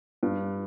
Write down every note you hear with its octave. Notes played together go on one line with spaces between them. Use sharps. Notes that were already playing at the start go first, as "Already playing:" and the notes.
G2